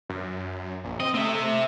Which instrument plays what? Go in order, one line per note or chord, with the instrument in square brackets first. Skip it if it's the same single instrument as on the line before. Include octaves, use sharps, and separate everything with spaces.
[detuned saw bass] F#2
A#1
[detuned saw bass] C4 [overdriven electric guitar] D#5
[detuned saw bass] A3 [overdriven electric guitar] C4 E5